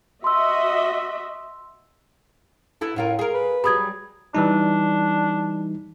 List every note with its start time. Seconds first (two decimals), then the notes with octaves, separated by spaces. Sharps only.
0.24 F#4 D#5 E5 C6 E6
2.81 B3 E4 A4
2.96 A2 C#4 F4 A#4
3.19 G#4 A#4
3.34 B4
3.64 F#3 G3 G#4 B5 D#6 G#6
4.35 E3 G3 D4 D#4